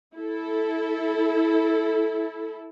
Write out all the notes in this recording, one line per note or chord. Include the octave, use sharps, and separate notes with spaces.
E4 A4